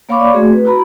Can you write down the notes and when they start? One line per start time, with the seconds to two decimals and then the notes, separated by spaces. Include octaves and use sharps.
0.09 A#3 C#5 F5 B5 C#6 D6
0.20 D5
0.34 A3 C4 F#4 G#4
0.53 B4
0.65 E4 F#4 A#5 B5